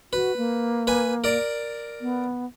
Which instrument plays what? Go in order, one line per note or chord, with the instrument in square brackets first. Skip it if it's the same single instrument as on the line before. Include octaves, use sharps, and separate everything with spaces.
[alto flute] F#4 [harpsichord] B4
[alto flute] A#3
[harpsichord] B4 G#5
A#4 D5
[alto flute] B3